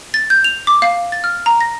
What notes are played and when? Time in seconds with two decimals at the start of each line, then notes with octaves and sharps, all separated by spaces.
0.14 A6
0.30 G6
0.44 F7
0.67 D6
0.82 F5
1.12 A6
1.24 F6
1.46 A#5
1.61 A#6